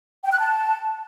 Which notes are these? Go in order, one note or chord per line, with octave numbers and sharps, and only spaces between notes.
G5
F#6
A5